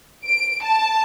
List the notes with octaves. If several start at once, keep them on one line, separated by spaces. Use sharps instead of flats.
D7
A5